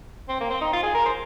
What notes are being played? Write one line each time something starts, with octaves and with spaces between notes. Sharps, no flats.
C4
A#3
C4
D#4
F4
G#4
A#4
C5